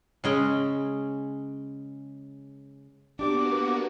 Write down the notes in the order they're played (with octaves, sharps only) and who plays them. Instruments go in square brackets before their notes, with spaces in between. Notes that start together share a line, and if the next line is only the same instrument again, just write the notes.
[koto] C#3 G#3 C#4
[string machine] A#3 B3 F#4 [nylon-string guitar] D4 G4 D5 [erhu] D6